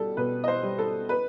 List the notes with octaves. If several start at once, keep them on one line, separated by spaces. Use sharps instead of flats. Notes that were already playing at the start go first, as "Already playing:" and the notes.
Already playing: B2 G3 A4
B2 B4
D#5
C5
G3
A4
B4